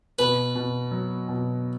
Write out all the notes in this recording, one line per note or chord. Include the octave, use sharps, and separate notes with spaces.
B2 B4
B2
F#3
B2